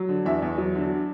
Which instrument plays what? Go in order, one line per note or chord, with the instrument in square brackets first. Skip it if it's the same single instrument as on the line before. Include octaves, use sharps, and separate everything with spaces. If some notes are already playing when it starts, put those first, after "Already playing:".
Already playing: [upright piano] F#3
D3
E2 E5
E2
F#3
D3